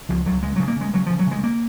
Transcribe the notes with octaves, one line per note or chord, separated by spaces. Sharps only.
C#2 F3
C#2 F#3
C#3 G#3
C#3 F#3
A#3
C#3 G#3
C#3 F#3
C#3 F3
F#3
C#3 G#3
A#3